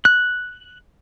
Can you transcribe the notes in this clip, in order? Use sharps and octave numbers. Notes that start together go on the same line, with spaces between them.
F#6